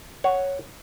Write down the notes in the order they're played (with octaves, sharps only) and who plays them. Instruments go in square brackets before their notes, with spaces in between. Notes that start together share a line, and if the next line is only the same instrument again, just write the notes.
[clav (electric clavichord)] C#5 F#5